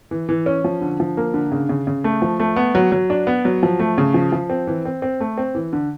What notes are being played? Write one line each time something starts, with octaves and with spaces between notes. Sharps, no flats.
E3
E3
C#4
F3
D3
F3
A#3
D3
C#3
C#3
C#3
A3
F3
A3
B3
F#3
F#3
D4
B3
F#3
F3
A3
C#3
F3
F3
C4
E3
C4
C4
A3
C4
E3
D3